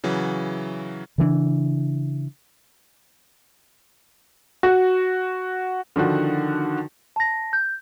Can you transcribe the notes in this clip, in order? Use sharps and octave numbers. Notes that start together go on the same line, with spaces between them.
C#3 E3 F#3
C#3 E3 C#4 D4
F#4
D3 D#3 F3 F#4
A5 A#6
G6